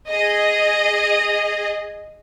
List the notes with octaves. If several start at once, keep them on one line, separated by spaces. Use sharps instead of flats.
G#4 D#5